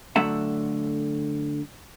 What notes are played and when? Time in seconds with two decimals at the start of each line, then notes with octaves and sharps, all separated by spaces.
0.16 D3 F#3 A3 E5 F#5